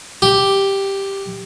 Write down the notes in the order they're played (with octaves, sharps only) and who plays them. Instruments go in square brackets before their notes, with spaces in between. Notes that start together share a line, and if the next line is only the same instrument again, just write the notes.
[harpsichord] G4